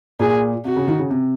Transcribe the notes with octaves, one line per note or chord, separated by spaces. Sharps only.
A#2 G#4
C3 F#4
C#3
D#3
C#3
C3